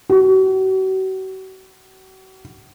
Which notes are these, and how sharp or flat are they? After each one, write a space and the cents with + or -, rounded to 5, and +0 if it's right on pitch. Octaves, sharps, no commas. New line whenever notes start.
F#4 +40